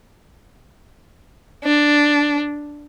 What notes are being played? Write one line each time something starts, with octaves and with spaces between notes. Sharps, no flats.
D4